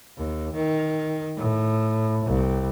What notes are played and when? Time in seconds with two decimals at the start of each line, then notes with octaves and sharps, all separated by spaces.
0.17 D#2
0.56 D#3
1.36 A2
2.26 C2